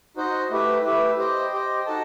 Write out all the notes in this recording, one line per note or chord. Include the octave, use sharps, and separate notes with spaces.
D#4 F#4 C5 D#5
A3 E4 G4 B4 E5
A3 E4 G4 B4 E5
G4 C5 D#5 G5
G4 C5 D#5 G5
D#4 F#4 A4 D#5 A5